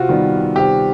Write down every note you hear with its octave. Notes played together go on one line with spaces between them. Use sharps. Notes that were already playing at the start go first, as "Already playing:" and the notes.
Already playing: C3 F4 F#4
D#3 G3 B3
C3 G4